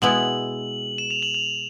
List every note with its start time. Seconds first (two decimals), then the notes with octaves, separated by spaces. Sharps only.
0.02 B2 G#3 B3 E4 F#7
0.98 E7
1.11 F7
1.23 F#7
1.34 F7